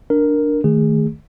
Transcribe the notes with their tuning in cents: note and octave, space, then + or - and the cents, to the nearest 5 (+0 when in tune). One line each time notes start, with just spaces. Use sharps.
D4 +0 A#4 +0
D#3 +0 A3 +0 G#4 -20